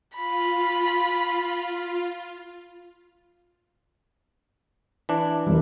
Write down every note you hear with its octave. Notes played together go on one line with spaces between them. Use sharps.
F4 B5
E3 D4
E1 G3